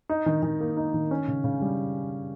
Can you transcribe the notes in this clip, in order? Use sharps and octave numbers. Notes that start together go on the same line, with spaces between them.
D#4
D#3
D#3
A#3
D#4
D#3
C#4
C#3
C#3
G3